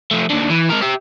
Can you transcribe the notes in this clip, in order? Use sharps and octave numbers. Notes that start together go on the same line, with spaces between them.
F3 A3
D#2 D3
E3
G#3 A#4
G4 E5